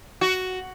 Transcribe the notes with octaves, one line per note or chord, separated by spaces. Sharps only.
F#4